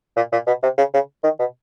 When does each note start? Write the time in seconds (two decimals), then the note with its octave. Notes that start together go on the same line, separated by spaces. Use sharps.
0.16 A#2
0.32 A#2
0.47 B2
0.63 C3
0.78 C#3
0.94 C#3
1.24 D#3
1.39 B2